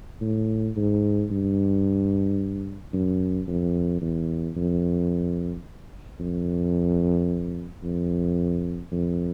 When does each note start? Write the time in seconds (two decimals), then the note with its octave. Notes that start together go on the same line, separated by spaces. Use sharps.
0.21 A2
0.76 G#2
1.31 G2
2.93 F#2
3.48 F2
4.02 E2
4.57 F2
6.20 F2
7.83 F2
8.92 F2